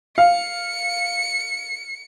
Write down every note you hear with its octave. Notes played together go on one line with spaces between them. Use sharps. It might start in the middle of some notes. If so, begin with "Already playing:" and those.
F5 C#7